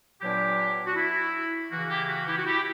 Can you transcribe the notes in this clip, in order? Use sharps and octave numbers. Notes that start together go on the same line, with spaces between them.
A#2 F#3 B3 D4 E4 G4
F#4
E4
C#3 E3 A#3 F#4
E4 G4
F#4
E4 G4
F#4
E4 G4